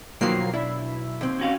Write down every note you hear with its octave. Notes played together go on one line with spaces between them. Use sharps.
B1 B2 D#3 F3 F#3 A#3 C7
D4 E4 E5
D#2 C4
C#4 F#4 F5